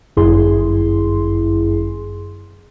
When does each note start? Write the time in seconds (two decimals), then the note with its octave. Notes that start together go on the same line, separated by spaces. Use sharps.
0.17 G1 F#2 E4 G#4 C6